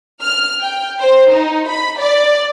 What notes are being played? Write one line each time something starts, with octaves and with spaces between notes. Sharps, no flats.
F6
G5
C5
D#4
B5
D5